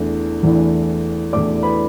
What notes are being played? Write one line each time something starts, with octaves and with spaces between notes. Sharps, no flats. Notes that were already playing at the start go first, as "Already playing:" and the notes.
Already playing: E2 E3 A3 D4
E2 E3 A3 D4
E2 E3 A3 D4 D5 D6
B4 B5